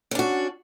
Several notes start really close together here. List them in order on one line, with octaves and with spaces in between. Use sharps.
C#4 D4 F#4